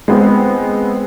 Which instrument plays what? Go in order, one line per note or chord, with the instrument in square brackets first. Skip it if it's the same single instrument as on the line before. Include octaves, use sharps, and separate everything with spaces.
[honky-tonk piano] G#3 B3 C4